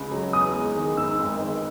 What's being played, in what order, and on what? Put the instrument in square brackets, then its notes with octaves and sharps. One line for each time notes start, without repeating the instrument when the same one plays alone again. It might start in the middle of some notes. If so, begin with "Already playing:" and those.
Already playing: [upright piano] C#2 C#3
F#3
E2 D#6
G#3
D#3
G#2 E6
G#1
D#3